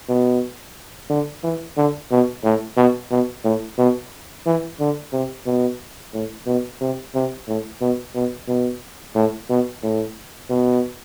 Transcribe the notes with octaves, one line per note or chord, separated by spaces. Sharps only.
B2
D3
E3
D3
B2
A2
B2
B2
A2
B2
E3
D3
C3
B2
A2
B2
C3
C3
A2
B2
B2
B2
A2
B2
A2
B2